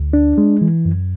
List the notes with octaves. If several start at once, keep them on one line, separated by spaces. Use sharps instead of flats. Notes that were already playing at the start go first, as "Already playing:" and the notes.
Already playing: D2
D4
G#3
E3
F#2